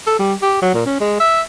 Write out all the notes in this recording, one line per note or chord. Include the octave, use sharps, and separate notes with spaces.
A4
G3
G4
F#3
A#2
C#4
G#3
E5